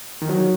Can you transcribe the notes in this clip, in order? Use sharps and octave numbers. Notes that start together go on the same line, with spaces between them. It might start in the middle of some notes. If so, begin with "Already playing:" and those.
D#3
F#3